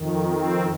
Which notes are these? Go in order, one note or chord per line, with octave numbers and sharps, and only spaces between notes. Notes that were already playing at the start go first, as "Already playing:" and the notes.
Already playing: F2 D#3
C4